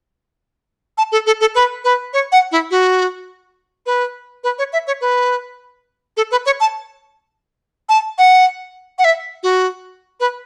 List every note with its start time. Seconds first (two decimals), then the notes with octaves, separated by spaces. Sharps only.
0.98 A5
1.12 A4
1.26 A4
1.41 A4
1.55 B4
1.84 B4
2.13 C#5
2.32 F#5
2.52 E4
2.71 F#4
3.86 B4
4.44 B4
4.58 C#5
4.73 E5
4.87 C#5
5.01 B4
6.17 A4
6.31 B4
6.46 C#5
6.60 A5
7.89 A5
8.18 F#5
8.99 F#5
9.04 E5
9.43 F#4
10.20 B4